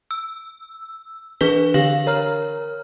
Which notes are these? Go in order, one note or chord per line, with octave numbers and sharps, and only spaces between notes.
E6
E3 D4 G#4 B4 B6 G7
D3 G4 F5 A#6 F#7
A#4 C#5 A#5 F6